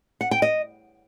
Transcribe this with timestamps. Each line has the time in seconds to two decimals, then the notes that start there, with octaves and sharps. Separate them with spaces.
0.21 F#5
0.31 G5
0.42 D#5